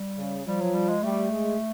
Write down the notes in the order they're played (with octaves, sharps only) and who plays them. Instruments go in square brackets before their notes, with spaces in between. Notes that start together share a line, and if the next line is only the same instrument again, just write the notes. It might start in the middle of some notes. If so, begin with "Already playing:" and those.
Already playing: [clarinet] G3
[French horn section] C#3
[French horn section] F3 [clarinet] G3
[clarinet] F#3
G3
G#3
[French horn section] G3 [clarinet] A3
[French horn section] G#3